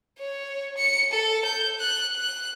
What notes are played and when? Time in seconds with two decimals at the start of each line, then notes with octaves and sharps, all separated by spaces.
0.18 C#5
0.77 C#7
1.11 A4
1.45 G6
1.79 F#6
2.16 F#6